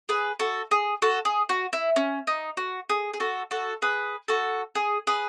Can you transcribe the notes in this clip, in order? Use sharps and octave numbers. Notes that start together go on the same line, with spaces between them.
G#4 B4
F#4 A4
G#4
F#4 A4
G#4
F#4
E4
C#4
D#4
F#4
G#4
G#4
F#4 A4
F#4 A4
G#4 B4
F#4 A4
G#4
G#4 B4